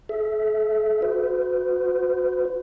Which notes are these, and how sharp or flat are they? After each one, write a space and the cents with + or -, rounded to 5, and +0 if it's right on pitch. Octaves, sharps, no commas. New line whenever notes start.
A4 -40 E5 -10
F#4 -20 B4 +45